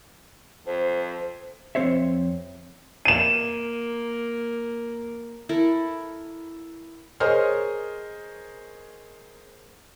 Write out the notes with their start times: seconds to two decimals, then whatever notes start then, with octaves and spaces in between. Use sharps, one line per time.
0.66 F2 C5
1.75 F2 C4 C5 C#5 E5
3.05 A#3 D#7 E7
5.49 E4 A4 A#4
7.20 G#4 A#4 C5 C#5 D#5 F6